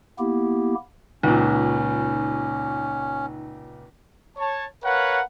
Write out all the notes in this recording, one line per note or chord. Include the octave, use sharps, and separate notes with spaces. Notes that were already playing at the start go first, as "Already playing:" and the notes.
A#3 B3 E4 G4
C#2 A#2 C#4 D#4
C#5 A5
A#4 B4 C#5 F5 F#5